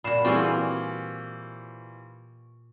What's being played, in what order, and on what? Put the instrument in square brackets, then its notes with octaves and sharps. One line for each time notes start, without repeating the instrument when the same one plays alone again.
[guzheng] A#2 F#4 [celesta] B5 C7 E7
[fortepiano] E3 G3 F4 [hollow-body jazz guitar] C4 G#4 [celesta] C#6 D6